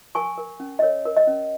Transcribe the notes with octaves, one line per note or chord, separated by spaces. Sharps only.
A#4 G#5 C#6
A#4
C#4
D#5
A#4 C#5
A#4
D#5
C#4